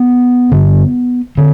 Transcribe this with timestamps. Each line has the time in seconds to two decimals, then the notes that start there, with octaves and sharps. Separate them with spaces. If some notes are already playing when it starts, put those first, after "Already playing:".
Already playing: B3
0.52 G2 D3
1.38 D3 C4